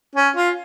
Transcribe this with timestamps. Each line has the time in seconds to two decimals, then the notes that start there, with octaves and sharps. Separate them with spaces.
0.15 C#4
0.36 F4